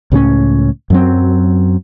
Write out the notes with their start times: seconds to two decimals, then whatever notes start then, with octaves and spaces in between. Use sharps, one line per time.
0.12 C#2 A2 G3 C#4
0.90 F#2 F#3 C4